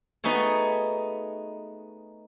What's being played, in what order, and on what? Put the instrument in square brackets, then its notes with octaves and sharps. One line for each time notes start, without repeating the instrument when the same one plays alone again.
[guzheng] A3 B3 D#4 F#4 G#4 C#5